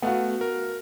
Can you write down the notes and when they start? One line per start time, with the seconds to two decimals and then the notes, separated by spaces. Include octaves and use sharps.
0.02 A3 B3 F#4 F5 F#5
0.41 A#4